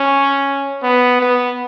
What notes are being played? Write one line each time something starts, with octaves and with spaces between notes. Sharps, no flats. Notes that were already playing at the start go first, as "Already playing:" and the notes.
Already playing: C#4
B3
B3